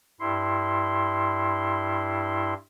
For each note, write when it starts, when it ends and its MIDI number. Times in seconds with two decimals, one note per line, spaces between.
0.20 2.54 43
0.20 2.54 64
0.20 2.54 84